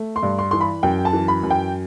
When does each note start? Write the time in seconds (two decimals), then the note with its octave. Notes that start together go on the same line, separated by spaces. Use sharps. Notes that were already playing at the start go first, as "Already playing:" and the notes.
Already playing: A3
0.16 C6
0.23 G2
0.39 C6
0.51 E3 C6
0.61 B5
0.83 F#2 G5
1.05 A5
1.13 E3
1.28 B5
1.43 F#2
1.51 G5